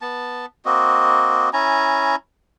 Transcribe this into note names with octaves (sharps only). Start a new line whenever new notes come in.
B3 A5
A#3 C4 F#4 D#5
C#4 E4 G#5 A#5